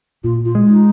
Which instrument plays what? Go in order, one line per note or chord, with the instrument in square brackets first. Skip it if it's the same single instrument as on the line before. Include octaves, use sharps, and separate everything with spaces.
[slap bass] A#2 [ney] F4
[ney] F4
[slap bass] G#3
[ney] D#4